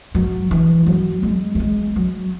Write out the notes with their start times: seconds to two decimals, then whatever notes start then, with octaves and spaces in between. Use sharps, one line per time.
0.15 F#3
0.51 E3
0.86 F#3
1.23 G#3
1.55 A3
1.60 G#3
1.96 F#3